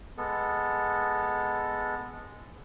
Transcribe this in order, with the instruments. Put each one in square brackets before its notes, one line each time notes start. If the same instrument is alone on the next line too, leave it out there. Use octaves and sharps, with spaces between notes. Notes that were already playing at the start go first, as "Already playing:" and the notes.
[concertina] G#3 B3 A4